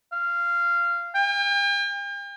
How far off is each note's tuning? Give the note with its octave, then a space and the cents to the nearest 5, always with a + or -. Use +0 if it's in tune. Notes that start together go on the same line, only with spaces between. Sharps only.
F5 -15
G5 +40